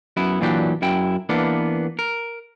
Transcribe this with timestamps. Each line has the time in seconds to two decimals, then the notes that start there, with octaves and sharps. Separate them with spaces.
0.17 F#2 B3 E4
0.41 A#2 E3 F#3 D4 G4
0.82 F#2 E4 G5
1.29 E3 A#3 B3 D4
1.99 A#4